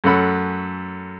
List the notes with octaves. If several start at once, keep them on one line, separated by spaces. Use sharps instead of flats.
F#2 A3 C#4 A4 F#5 B5